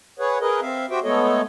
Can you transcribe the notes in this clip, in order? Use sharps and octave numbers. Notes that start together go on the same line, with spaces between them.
G#4 B4 C#5 F#5
G#4 A#4 B4 D#5
C4 E5 F5
F#4 G4 C5 E5 G5
G#3 A3 B3 A4 C#5 D#5